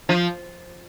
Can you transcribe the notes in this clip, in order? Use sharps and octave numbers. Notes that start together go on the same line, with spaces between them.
F3